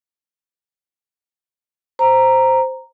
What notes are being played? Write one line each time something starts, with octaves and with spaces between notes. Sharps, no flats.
C5 A#5